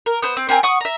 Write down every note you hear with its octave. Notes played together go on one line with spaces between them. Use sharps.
A#4
B3 C5
C4
C4 G4 A#4 G#5
F#5 C#6 D#6
E5 A#5